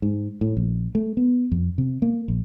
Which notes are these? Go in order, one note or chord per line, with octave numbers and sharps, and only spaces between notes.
G#2
A2
A#1
A3
B3
F2
C3
A#3
A#1